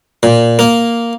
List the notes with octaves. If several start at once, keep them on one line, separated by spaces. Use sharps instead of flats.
A#2
A#3